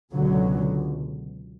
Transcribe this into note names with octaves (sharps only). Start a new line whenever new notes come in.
C#2 B2 D3 F#3